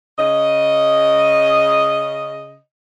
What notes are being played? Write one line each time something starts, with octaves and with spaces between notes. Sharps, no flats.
C#3 D#5